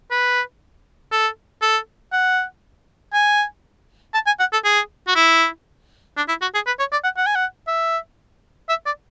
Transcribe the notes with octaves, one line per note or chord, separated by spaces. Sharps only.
B4
A4
A4
F#5
G#5
A5
G#5
F#5
A4
G#4
F#4
E4
D4
E4
F#4
G#4
B4
C#5
D5
F#5
F#5
G#5
F#5
E5
E5
D5